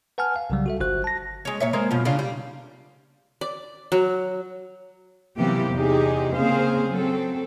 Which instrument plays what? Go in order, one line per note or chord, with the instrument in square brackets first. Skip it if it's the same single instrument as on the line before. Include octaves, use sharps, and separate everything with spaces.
[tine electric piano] B4 F#5 G#5 A5 F6
F5
C2 C#3 F#3 G3
F#4 A4 E5
G1 F#4 C5 F#6
A5 A#6
[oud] G#3 C#4
A#2 C#5 E5
G#3 A#3 C4
F#2 B2 F3
C#3 D4 F4
G3
[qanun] D5
F#3
[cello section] C3 E3 F#3 A#3 B3 G4
E2 C3 D#4 G4 G#4
C#3 A#3 C4 G#4 C5 F5
F#3 C4 A4